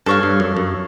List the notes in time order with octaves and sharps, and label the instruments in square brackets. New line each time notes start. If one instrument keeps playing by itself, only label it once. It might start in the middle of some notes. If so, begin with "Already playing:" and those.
[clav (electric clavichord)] G2 [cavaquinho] A4 C#5 F5
[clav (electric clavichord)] G2
F#2
F#2